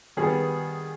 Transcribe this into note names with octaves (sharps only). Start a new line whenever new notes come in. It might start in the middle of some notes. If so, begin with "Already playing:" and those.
D#3 G3 B3 G#4